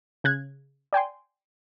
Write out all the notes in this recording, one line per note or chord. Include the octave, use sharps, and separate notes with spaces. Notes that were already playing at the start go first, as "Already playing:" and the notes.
C#3 F#6 G#6
D5 G5 G#5 C6